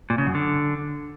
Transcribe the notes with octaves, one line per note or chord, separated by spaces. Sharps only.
A#2
C#3
F#2
D3